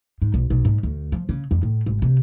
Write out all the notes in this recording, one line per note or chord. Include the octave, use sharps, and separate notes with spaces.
G#2
B1
B1
G#2
D2
F3
C#3
F2
A2
G#1
C3